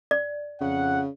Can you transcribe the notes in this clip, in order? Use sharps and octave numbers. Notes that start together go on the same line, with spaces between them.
D5
F2 C#3 F#5